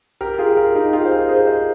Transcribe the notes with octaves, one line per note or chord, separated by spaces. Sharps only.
G4 A#4
F4 G#4
G4 A#4
D#4 G4
F4 G#4
C5
G4 A#4
G#4 C5
C5 D#5